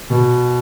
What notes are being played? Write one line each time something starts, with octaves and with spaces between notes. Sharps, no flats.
B2